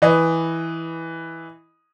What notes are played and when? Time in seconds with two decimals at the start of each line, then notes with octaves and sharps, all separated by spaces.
0.02 E3 D#5